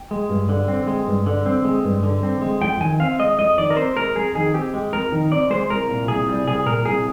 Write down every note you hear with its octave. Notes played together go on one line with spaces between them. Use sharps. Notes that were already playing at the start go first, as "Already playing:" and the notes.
Already playing: G5
G#3
G2
D3
C4
G#3
G2
D3
C4
G#3
G2
D3
C4
G#3
F2 G5
D#3 G#5
C4 F5
G#3 D#5
F2 D#5
D#3 D5
A#4
C4 C5
G#3 A#4
F2 G#4
D#3 G#4
C4 G4
G#3
F2 A#4
D#3
C4 D5
G#3 C5
C2 A#4
A#2
C2 G#4
G3
C2 G#4
A#2 A#4
C2 G#4